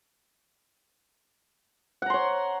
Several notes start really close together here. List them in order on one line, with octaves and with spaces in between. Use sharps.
F#5 A#5 C6 C#5